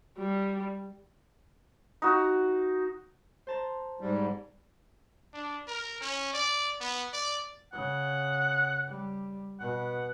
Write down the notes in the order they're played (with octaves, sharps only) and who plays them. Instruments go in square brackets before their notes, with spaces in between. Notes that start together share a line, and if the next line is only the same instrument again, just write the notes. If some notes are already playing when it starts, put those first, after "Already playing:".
[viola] G3
[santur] D#4 F#4
[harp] C5 A5 A#5
[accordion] G#2 G3
[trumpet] D4
A#4
C#4
D5
B3
D5
[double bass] C#3 [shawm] F#5
[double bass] G3
[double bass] B2 [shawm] F#5